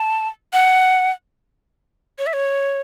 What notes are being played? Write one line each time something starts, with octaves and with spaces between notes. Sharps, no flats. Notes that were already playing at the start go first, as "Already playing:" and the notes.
Already playing: A5
F#5
C#5
E5
C#5